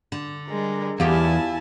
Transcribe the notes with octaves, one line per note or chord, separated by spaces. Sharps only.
D3
G3 G#3 A#4
E2 E4 F4 G4 G#5 A5